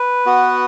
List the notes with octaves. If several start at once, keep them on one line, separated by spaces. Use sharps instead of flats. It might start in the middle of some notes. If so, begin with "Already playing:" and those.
Already playing: B4
B3 F#4